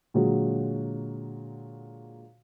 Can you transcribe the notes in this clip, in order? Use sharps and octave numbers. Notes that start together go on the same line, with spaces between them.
A#2 D3 F#3 G#3 F#4 C#5